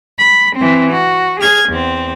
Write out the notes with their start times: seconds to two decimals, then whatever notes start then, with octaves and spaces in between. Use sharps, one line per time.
0.19 B5
0.56 E3 C4
0.93 F#4
1.40 G#4 F6 G#6
1.69 E2 C4